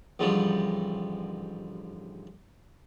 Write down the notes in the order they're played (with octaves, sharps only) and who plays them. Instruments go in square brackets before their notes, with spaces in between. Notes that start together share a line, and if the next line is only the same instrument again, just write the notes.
[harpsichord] A1 G#2 D3 F3 G3